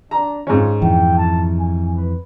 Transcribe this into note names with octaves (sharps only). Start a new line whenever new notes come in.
D4 A#5
G#2 C#4 F4
F2 E3 G5
A5
G#5
B4